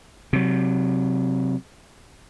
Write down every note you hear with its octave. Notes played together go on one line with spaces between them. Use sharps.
C3 F#3